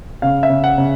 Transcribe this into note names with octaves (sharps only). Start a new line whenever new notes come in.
C#3 F5
E5
C#3
F#5
C#3